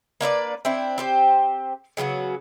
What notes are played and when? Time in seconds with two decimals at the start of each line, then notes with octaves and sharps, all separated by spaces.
0.21 A#3 D4 B4 D5
0.65 C4 D4 E4
0.98 C4 G4 C5
1.97 C#3 F#3 B3 F#4